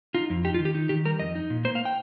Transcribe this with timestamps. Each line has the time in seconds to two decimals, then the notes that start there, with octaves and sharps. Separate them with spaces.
0.14 D#4 F4
0.30 F2
0.45 D#4 G4
0.54 F4
0.59 D#3
0.65 G4
0.75 D#4
0.89 D#3 G4
1.05 G3 A#4
1.19 F2 D#5
1.35 D#4
1.50 A#2
1.65 A#3 C5
1.75 F5
1.85 G5